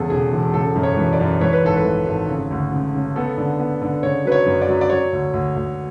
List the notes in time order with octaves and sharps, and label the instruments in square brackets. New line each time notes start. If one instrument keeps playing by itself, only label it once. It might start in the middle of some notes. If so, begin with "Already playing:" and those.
Already playing: [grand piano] E2 C#3 G#4 A4
E1 G#4
E1
C#3 A4
F#2
C#5
E3
D5
F#2
E3 C#5
B4
G#1 A4
B4
E3
G#1
C#3
D2
C#3
C#3
B3 A4
D3
B3
D3
C#3 C#5
F#3 B4
C#5
F#2
D5
F#3
D5
F#3 C#5
D2
D2
D2